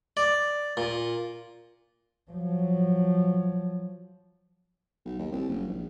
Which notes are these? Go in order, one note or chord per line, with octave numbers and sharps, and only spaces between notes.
D5
A#2
F3 F#3
B1
D#2
C2
F#1
A#1